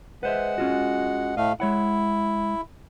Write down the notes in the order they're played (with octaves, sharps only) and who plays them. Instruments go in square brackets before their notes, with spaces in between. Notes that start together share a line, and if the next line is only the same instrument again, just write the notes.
[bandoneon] G#3 F#5 [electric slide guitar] B4 C5 E5
[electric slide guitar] C#4 F4 F#4
[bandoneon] A2 A3 F5 [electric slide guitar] D#5
[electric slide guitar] G#3 C#5 F#5 [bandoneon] E4